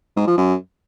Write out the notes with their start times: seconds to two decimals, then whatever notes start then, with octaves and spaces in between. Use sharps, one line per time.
0.16 G#2
0.27 F3
0.38 F#2